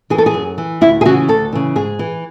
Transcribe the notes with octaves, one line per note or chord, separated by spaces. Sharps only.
E3 G#4
A4
G#4
F#2
E3
D2 E4
G#4
C#3 E3 F#4
D2 A4
C#3 E3
G#2 G#4
E3